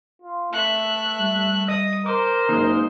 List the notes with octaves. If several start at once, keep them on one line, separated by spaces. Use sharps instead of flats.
F4
A3 E5 F#6
G3
D#5 D#6
A#4 C5 D6
F#1 G#3 A#3 D#4